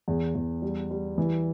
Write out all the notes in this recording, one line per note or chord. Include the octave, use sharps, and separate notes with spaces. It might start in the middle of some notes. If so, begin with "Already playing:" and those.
E2
E2
G3
G3
E3